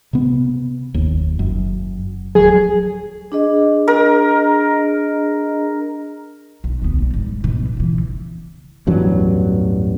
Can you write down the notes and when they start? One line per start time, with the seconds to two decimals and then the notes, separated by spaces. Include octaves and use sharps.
0.13 C3 B3
0.94 F#1 D#2
1.39 F#1 F#2
2.35 D1 F#3 G#4
3.32 D4 G#4 D#5
3.88 A#4
6.64 B1
6.82 D2 B3
7.02 G3
7.14 G#2
7.44 B2
7.77 C#3 E3
8.87 A1 E2 G2 F#3